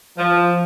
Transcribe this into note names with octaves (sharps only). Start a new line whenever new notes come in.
F3